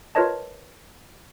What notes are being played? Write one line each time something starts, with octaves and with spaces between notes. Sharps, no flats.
F4 A#4 B4 C#5 D#5 A5